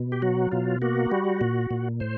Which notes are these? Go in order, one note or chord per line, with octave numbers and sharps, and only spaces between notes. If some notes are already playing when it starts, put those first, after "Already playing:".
Already playing: B2
G4
F#3 F#4
B2 F4
A#3 F#4
G3
A#2
A#2
A2 C5